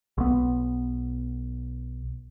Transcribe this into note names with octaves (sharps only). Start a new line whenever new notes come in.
B1 B3